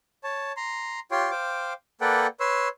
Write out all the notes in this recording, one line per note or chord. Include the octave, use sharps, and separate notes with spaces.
C#5 A5
A#5 C6
F4 G4 C#5 G5 C6
C5 F5 G5 D6
A#3 A4 B4 D5 F#5 G5
B4 C#5 C6 E6